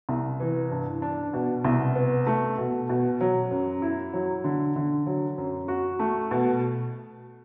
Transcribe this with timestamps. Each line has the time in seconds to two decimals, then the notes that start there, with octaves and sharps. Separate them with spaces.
0.09 C2
0.40 E3
0.71 G2
1.02 D4
1.33 B2
1.65 C2
1.95 B3
2.27 A3
2.58 B2
2.89 B2
3.21 F#3
3.51 F#2
3.82 E4
4.13 F#3
4.44 D3
4.76 D3
5.06 F#3
5.38 F#2
5.68 F#4
5.99 A3
6.31 B2